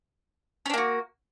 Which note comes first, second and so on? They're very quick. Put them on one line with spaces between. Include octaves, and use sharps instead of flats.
C#4 D4 A#3 F#4